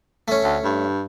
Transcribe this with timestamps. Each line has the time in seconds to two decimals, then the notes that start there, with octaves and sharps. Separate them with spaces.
0.28 A3 C#4
0.44 D2
0.64 G2